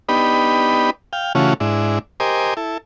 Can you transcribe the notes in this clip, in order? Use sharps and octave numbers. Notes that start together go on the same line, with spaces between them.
B3 D4 D#4 G4 B5
F5 G5
C#3 E3 A3 C#4 F4 F#4
G#2 D4 E4
G4 A#4 C5 D#5 G#5 D6
E4 A4